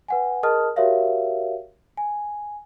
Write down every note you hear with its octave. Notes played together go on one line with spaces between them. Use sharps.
B4 F#5 G#5
G#4 A#4 D#5 A5 D#6 F6
F#4 G4 A#4 C#5 E5 F5
G#5